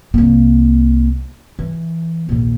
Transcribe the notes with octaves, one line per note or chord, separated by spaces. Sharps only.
C2 A#3
E3
A#1 D#2